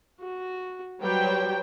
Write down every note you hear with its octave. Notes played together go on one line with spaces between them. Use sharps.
F#4
F#3 G3 B4 C5 G5